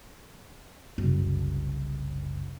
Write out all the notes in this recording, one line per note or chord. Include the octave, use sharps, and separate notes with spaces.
F#1 C2